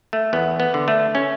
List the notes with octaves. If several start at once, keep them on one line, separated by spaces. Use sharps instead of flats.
A3
E2 B3
B3
D3
A3
C#4